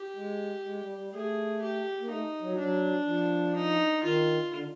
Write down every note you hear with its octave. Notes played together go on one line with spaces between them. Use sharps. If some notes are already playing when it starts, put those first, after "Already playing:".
Already playing: G4
G#3
G#3
G3
G3
A3 G#4
G4
A#3
A3 D#4
F#3
F#3 D4
F3
D#4
D#3 F4
D3